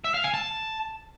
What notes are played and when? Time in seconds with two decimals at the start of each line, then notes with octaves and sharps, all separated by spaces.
0.04 E5
0.14 F5
0.24 G#5
0.34 A5